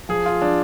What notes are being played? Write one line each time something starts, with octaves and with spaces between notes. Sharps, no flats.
F3 G#4
F4
F3 D4